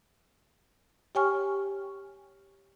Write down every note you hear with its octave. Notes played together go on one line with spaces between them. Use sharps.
G4 C#5 G5 G#5 C#6 F6